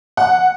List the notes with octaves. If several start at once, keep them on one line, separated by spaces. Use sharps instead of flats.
F#5